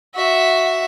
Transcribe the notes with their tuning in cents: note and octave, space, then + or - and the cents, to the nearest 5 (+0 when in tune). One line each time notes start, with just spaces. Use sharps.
F#4 +0 E5 +0